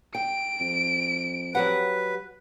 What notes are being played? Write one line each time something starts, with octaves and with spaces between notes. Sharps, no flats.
G5 D7
F2
F#3 G4 B4 F#5